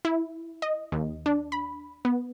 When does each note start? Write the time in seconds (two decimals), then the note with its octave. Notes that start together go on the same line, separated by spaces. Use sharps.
0.05 E4
0.62 D#5
0.92 D#2
1.26 D4
1.52 B5
2.05 B3